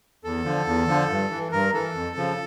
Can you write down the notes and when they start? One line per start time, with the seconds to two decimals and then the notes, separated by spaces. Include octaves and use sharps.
0.24 E2 A4
0.45 D3 F3
0.67 E2
0.88 D3 F3
1.09 G2
1.31 E3
1.52 G2 A#4
1.73 E3 A4
1.95 F2
2.16 C#3 F3